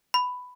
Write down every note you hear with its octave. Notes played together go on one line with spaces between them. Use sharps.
B5